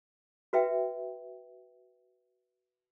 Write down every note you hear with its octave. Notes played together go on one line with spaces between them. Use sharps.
F#4 B4 E5 G5